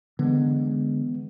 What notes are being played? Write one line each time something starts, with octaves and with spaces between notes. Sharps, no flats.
D3 E3 G#3 B3